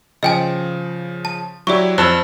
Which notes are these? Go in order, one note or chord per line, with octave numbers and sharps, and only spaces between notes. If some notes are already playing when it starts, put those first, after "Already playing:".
C#3 F3 D#5 G5 G#5
A5
F#3 E4 G4 D5 C#6
F2 C5 A5 E6 F#6